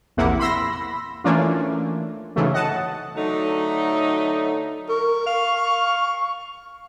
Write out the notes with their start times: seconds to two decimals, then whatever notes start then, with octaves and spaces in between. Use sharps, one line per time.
0.17 A#1 E2 C3 A#3 E4 F#5
0.40 B5 C6 E6 A#6
1.24 E3 A3 A#3 C#4 D4 F4
2.36 G#2 C#3 E3 F#3 A3
2.53 D#5 F#5 A5
3.17 D3 F#3 A3 D#4
4.89 A#4 C#6
5.26 F5